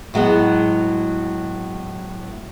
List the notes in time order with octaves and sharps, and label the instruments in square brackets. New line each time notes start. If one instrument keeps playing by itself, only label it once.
[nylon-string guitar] A2 F#3 G#3 B3